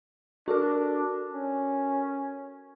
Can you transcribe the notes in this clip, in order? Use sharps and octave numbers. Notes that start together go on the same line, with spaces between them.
D4 F#4 A4 A#4
C#4